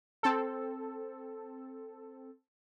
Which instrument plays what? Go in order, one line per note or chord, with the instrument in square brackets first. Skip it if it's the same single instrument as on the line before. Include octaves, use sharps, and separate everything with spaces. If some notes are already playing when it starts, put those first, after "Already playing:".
[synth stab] C4 A4